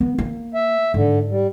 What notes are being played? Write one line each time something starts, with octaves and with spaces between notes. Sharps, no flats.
B3
A#3
E5
G#2 D3
G3